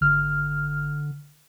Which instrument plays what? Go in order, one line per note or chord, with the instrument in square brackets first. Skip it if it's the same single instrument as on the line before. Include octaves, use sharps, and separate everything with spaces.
[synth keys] G#1 F6 [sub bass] D3